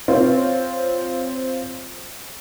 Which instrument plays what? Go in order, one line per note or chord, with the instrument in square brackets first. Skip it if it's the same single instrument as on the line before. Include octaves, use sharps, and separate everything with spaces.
[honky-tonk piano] C4 F4 C5 C#5